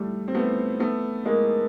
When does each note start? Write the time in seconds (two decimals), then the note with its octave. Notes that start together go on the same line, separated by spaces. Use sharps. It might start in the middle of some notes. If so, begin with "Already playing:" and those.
Already playing: G3 A3
0.28 C4
0.35 A3 B3
0.80 A3 B3
1.26 G#3 A#3